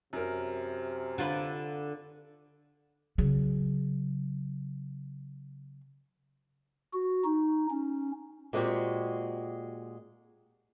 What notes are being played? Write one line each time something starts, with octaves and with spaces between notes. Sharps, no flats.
F#2 C3 A#4
D3 F4 B4
C#3 F#3
F#4
D#4
C#4
A#2 G#3 C4 F#4 G4